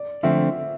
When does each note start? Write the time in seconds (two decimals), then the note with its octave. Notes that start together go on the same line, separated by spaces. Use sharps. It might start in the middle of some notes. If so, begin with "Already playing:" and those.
Already playing: D5
0.23 D3 F3 A3 C4 E5